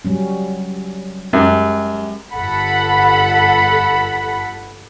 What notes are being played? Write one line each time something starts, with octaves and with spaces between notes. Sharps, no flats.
F#3 G3 C#4
F#2 G#3 G4
G1 A4 F#5 B5